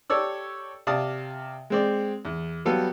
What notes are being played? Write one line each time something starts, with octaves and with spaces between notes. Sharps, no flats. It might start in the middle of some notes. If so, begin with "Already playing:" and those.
G4 A4 C#5 D5 E6
C3 D5 F5 A5 D#6
G#3 C4 D5
E2
F#3 G3 B3 A4 F5